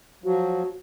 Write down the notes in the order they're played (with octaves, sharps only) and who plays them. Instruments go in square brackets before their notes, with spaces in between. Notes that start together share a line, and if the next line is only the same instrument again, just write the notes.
[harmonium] F3 F#3 [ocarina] F#4